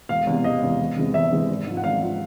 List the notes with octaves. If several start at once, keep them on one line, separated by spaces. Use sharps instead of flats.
E1 F5
E2 C3
E1 D#5
E2 C3
E2
C3 E3 G#3 C4
E2 E5
C3 E3 G#3 C4
G#1
G#2 F3
F#5
G#1 F5
F3